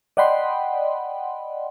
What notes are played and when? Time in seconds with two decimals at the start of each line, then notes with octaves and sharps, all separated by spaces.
0.17 D5 D#5 F#5 G5 B5 C6